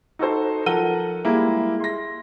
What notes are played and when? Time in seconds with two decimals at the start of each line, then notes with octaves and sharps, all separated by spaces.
0.19 D#4 F#4 A4 C5
0.66 F3 A4 A#4 F#5 D#7 G7
1.25 G3 G#3 A#3 E4
1.80 C6 A#6